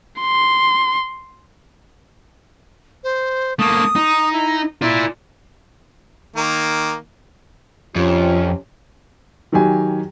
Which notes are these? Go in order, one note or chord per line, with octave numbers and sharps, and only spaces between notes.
C6
C5
A3 A#3 D#6
D#4
E4
E4 F4 D5
D#3 A#3
F2 C3 C#4 F4
D#3 F#3 G4 G#5